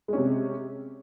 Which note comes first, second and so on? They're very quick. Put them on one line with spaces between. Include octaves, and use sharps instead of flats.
G#3 C#4 C3